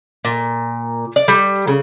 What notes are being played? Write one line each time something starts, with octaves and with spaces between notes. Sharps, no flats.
A#2
D5
G3
C#3